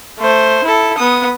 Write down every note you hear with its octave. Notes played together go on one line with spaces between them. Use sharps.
A3 C5
E4 A4
B3 D#6